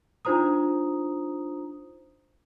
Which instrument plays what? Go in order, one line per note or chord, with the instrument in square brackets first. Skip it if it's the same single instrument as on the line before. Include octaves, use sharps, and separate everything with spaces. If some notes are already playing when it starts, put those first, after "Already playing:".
[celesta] D4 D#4 F4 C5 A#5 D#6